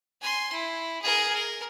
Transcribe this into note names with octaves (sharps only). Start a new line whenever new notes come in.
G#5 C6
E4
G#4 A#4
A#4